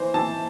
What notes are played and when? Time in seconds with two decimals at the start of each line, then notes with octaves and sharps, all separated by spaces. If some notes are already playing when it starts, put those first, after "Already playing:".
Already playing: E3 C5
0.14 E3 A5